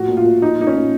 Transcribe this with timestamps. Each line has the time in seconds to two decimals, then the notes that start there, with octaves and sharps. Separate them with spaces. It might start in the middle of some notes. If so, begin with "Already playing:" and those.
Already playing: A2 F3 F#4
0.08 A#2
0.17 F4
0.25 A#2
0.42 F3 D#4
0.59 A#2 D#4
0.67 C#4
0.75 A#2